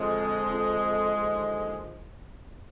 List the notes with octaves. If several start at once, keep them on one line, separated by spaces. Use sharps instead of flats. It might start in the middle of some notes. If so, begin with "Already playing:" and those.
Already playing: F2 D3 F3 G#3
F2 D3
D#2 D3